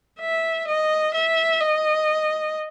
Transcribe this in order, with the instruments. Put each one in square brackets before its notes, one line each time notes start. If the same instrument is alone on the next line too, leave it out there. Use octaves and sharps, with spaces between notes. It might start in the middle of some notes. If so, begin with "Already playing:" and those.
[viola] E5
D#5
E5
D#5